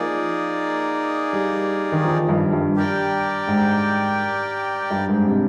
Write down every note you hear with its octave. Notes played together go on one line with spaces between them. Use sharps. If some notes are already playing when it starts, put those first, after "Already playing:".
Already playing: F3 A#3 D#4 G#4 D5
G3
D#3
F3
G2
G2
G4 A#4 D5 G5
G#2
G2
G#2
C3